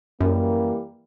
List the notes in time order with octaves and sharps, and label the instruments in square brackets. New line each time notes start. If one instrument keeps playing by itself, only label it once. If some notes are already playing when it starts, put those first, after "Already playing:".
[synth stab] F#2 [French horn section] E3 G3 A#3